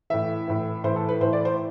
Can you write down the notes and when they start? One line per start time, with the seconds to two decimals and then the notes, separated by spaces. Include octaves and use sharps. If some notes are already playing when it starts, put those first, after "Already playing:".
0.10 A2 E3 E5
0.48 A2 E3
0.84 A2 E3 C5
0.96 A4
1.09 B4
1.20 A2 E3 C5
1.33 D5
1.45 C5